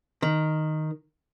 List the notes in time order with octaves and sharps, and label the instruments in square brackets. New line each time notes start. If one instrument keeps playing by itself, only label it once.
[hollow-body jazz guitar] D#3